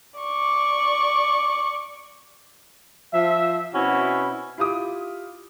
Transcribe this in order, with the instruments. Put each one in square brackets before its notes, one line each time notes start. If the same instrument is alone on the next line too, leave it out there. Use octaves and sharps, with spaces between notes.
[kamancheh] D5 C#6
[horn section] F3 E5
B2 C4 C#4 E4 F#4
[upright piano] E4 F4 G4 D6 D#6